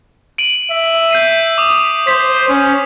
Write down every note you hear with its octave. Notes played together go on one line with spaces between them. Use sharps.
D7 D#7 F#7
E5
G6 C7 D#7
D6 D#6 F7
C5 B6
C#4